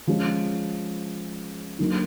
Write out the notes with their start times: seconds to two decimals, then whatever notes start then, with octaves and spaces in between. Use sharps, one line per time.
0.07 F3 G#3 C#4
1.79 D3 F#3 A#3 D#4